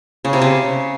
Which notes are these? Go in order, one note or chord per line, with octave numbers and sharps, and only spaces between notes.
C#3
C3
C#3